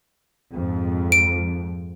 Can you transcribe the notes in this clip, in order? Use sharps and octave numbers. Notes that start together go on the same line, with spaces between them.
F2 G#2
D7